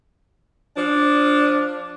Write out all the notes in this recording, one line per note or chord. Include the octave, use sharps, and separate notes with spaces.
F3 D4